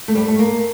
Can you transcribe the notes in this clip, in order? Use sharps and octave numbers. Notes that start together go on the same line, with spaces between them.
A3
G3
A3
A#3